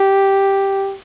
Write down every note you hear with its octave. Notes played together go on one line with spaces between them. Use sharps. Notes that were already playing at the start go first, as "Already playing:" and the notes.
Already playing: G4